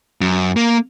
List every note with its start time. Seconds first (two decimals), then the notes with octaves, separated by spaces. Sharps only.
0.21 F#2
0.56 A#3